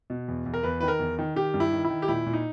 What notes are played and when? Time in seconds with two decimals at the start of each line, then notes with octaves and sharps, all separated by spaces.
0.10 B2
0.28 E2
0.46 E2
0.54 A#4
0.63 E2 B4
0.80 D#3 B4
0.88 A#4
0.99 E2
1.19 D#3
1.36 D#3 G4
1.54 G2
1.60 E4
1.73 D#3
1.85 E4
1.90 D#3
2.02 G4
2.08 A#2 E4
2.26 A#2
2.33 D#4